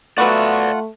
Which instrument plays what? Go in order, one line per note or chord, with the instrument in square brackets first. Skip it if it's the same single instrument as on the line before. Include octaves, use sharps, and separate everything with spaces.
[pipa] F#3 B3 F#4 [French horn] A3 [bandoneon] F4 F#5 [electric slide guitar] D5 E5